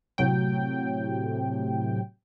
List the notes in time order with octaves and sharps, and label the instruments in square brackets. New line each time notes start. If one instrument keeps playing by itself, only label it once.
[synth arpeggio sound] A2 C3 F#3 G5